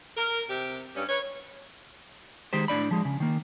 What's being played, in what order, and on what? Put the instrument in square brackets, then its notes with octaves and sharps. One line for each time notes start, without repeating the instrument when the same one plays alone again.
[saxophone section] A#4
C3 G4
G2 C#4
B4 C#5
[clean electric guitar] D#3 G#3 G4 C5
A2 D4 D5 B5
F3 G#3
C#3
D#3 A#3